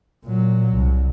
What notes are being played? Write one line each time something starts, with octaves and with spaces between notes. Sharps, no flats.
A#2 F#3
C2